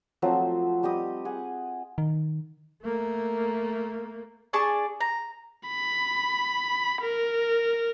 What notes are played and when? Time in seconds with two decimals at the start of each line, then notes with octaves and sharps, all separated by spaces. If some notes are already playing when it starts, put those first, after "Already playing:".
0.22 F3 F#3 A3 C4
0.83 G3 G4 D#5 D#6
1.25 G#4 F#5
1.98 D#3
2.83 A3 A#3
4.53 D4 G#4 A5 C#6
5.01 A#5
5.67 B5
7.02 A#4